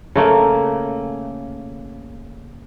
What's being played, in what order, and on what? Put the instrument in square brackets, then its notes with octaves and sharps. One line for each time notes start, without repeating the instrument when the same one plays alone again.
[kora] C#3 A3 A#3